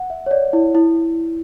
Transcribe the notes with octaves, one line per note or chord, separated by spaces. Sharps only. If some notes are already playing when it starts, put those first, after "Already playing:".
Already playing: F#5
E5
C#5
D5
E4
E4